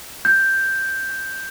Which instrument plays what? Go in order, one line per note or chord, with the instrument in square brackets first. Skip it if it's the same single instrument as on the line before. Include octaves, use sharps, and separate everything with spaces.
[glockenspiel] G6